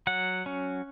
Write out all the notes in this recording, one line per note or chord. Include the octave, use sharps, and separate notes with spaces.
F#3 F#5
C#4